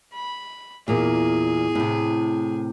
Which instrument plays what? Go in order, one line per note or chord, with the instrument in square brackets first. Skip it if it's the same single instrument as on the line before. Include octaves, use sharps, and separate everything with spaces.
[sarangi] B5
[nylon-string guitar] E2 A#2 [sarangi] G#4
[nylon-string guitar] A2 C3